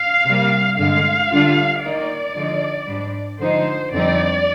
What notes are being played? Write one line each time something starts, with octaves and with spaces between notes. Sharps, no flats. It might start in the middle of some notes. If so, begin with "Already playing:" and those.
Already playing: F5
C3 G3 A#3
G2 D3 G#3 F5
D3 G3 D4 F4
D#3 A#3 D#4 D5
D3 F3 G#3 D#4
G#2 G3 D4
D3 F3 G#3 D#4 C5
F2 D3 G3 C4 D#4 D5